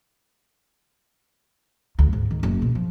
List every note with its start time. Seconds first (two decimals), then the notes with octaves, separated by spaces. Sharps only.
1.99 D2
2.13 G#2
2.31 D#3
2.43 F#1
2.62 B2
2.75 F3